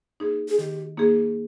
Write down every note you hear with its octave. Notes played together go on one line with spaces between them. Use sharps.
A#3 D#4 G#4
G#4
D#3 G4
A#3 D#4 G#4